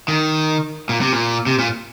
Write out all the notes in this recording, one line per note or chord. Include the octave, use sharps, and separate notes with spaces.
D#3
A#2
C3
A#2
C3
A#2